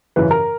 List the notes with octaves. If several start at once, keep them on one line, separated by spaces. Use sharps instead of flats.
F#2 C#3 E3 B4
A#4